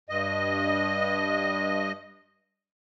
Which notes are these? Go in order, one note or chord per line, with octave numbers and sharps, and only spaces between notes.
G2 D#5